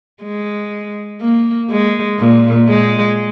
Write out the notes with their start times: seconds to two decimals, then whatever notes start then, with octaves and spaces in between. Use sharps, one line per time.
0.23 G#3
1.21 A#3
1.70 G#3
2.19 A#2
2.69 G#3